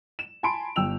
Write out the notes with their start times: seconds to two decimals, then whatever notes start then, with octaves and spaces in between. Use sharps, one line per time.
0.19 E7
0.43 G#5 A5 B5 C6 D7
0.76 G1 G5 E6 F7